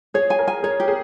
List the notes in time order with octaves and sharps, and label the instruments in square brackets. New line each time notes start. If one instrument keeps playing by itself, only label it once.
[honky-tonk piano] G#4 [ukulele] C#5
[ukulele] G#5
[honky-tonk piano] A#4
[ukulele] G#5
[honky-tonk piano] G#4 [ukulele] C#5
[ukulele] G4
[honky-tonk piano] G#4